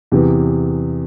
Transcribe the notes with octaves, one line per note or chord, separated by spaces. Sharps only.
E2 C3 E3